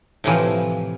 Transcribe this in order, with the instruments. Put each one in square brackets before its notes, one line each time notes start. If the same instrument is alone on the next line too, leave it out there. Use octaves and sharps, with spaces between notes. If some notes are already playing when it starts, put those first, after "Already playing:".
[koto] A2 C3 E3 F3